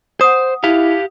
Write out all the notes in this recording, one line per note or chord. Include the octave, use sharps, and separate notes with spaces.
C5 F#5 D#6
E4 G4 F5